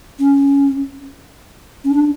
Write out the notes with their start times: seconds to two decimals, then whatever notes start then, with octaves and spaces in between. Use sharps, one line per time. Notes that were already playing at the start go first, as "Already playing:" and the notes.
0.19 C#4
1.84 C#4
1.91 D4